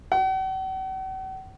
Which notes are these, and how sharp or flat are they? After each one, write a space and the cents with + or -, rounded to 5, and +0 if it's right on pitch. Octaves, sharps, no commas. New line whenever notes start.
F#5 +45